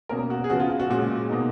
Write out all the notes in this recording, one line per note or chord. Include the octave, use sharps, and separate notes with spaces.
B2 A#3 C#4 A#4
F#4
G#4
C#3 F3 B3 F#4
F4
F4
F#4
A#2 G#3 C#4 F#4
B2 A#3 D#4